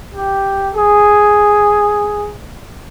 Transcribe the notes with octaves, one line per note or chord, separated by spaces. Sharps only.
G4
G#4